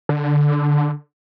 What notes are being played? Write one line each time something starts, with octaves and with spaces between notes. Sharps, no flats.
D3